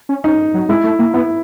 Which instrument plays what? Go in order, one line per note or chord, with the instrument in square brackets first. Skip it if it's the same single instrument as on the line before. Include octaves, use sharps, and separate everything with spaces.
[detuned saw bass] C#4
[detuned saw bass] C#4 [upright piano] D#4
[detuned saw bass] F#3
[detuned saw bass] G#3 [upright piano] E4
[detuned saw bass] A3
A#3
[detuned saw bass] B3 [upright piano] E4